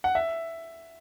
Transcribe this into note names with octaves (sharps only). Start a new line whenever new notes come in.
F#5
E5